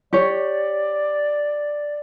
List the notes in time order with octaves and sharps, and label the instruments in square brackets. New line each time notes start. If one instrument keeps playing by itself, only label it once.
[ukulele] G4 C#5 [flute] D5